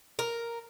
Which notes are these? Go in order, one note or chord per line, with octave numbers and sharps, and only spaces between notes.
A#4